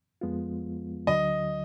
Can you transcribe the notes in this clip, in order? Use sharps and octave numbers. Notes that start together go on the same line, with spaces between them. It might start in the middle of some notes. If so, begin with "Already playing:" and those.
F2 F3 G#3 B3 F4
D2 D3 F#3 D#5